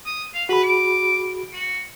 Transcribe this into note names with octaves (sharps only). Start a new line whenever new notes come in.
D#6
F5
F#4 G#4 B4 B5
D6
F#4